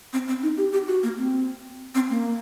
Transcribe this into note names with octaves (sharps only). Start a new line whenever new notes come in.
C4
C4
D#4
G4
G4
F#4
A#3
C4
C4
A#3